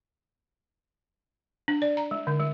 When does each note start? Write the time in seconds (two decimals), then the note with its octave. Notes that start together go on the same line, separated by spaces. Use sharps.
1.68 D4
1.82 D5
1.97 A#5
2.11 G#3
2.27 D3
2.40 G#3